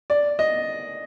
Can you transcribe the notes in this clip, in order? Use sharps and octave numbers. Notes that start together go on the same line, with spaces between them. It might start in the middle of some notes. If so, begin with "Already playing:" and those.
D5
D#5